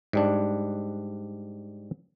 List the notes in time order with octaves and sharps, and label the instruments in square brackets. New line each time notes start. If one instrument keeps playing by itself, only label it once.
[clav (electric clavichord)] G#2 G3 D4